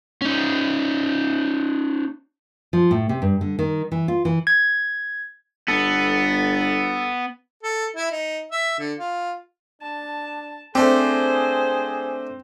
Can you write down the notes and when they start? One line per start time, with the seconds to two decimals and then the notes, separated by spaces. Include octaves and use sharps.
0.22 C#4 D#4
2.73 F3
2.91 A2
3.09 C3
3.22 G2
3.41 D3
3.59 D#3
3.92 E3
4.08 F4
4.25 E3
4.47 G#6
5.68 G1 B3 A4
7.63 A4
7.96 E4
8.11 D#4
8.51 E5
8.78 D3
8.99 F4
9.82 D4 A5
10.75 A3 C4 D4 G4 G#4 C5